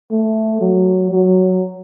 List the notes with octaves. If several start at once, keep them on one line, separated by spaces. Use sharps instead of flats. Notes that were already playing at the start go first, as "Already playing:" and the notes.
A3
F#3
F#3